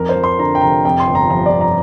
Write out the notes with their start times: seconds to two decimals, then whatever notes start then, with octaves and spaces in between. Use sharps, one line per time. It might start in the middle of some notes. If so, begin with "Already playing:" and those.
Already playing: F2 A#4
0.09 C5
0.16 F3
0.24 C6
0.39 D3 A#5
0.55 G5
0.61 F1 A#5
0.85 F2 G5
1.00 C6
1.07 G1
1.15 A#5
1.30 F3 A#5
1.46 D5
1.53 G1
1.61 A#5